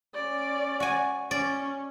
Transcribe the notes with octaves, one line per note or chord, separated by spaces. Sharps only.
C#4 D5
F#4 G#5
C#4 D5